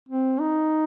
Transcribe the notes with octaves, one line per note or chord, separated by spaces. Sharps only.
C4
D#4